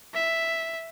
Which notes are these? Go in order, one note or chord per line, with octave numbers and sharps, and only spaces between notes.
E5